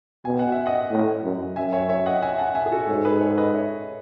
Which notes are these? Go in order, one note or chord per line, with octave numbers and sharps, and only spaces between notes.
B2 G#5
F#5
E5
D#5 F#5
A2
F#2
F#2 E5 G#5
C#5 E5
C#5 E5
D#5 F#5
E5 G#5
F#5 A5
E5 G#5
G#4
F#4 A4
G#2 A4 C#5
G#4 B4
A4 C#5
B4 D#5
C#5 E5